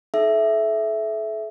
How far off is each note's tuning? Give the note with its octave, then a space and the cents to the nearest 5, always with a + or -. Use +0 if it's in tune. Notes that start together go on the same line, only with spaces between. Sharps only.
D#4 +15 A4 -40 E5 +0